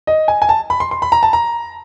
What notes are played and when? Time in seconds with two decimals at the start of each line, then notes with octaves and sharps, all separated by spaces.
0.07 D#5
0.28 G#5
0.42 G#5
0.49 A5
0.70 B5
0.80 C6
0.91 C6
1.02 B5
1.12 A#5
1.23 A5
1.33 A#5